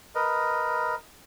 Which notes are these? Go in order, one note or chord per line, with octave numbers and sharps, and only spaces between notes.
A#4 B4 D#5